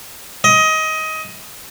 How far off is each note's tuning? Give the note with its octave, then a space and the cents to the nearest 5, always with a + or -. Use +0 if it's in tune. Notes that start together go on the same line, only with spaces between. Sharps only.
D#5 +20